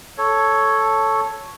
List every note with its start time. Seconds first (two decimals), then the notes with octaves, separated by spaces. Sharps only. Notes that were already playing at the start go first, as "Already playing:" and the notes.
0.18 A4 C#5